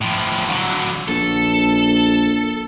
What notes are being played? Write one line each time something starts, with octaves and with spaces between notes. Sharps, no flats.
A2 F3
D3 F#3
A#1 A4